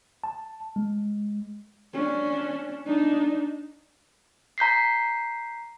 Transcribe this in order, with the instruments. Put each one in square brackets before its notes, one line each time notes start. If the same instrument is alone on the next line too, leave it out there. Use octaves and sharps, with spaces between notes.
[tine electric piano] A5
G#3
[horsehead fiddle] C#4 D4
D4 D#4
[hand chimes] A#5 G6 B6 C7